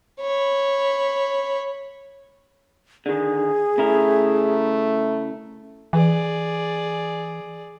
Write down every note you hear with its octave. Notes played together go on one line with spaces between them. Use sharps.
C#5 B5
D3 D#3 G#4
C#3 A3 E4 A#4
E3 G#4 D5